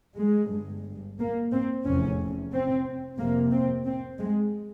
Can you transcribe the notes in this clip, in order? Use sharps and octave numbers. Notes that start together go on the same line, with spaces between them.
G#3
G1 G2
A#3
C4
F1 E2 C3 C#4
C4
F1 F2 C3 A#3
C4
C4
G#3